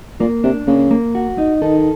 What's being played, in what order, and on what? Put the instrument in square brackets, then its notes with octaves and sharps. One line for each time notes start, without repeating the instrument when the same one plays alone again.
[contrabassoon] A#2 [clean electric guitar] A#3
[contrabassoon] C3 [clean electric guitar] D4
[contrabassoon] C#3 [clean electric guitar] A#3
[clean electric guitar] A#3
F#4
D#4
[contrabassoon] D#3 [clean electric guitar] A4